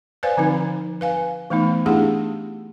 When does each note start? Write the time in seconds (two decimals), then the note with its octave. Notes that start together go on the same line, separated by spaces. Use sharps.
0.23 B4 C5 D5 F5 G#5
0.37 D3 F3 C4 D#4
1.01 B4 F5 G#5
1.50 E3 A3 B3 D#4
1.86 A3 D4 E4 G4 G#4 F#5